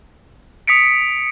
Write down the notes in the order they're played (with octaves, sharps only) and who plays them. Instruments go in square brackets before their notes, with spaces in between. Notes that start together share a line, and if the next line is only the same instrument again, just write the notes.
[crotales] D#6 B6 C#7 D7